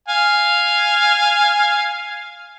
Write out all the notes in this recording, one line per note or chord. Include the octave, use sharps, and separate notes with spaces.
F5 G#5